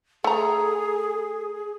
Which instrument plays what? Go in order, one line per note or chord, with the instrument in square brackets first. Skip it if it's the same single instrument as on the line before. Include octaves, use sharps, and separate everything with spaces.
[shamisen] A3 A#5 [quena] G#4 [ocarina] A4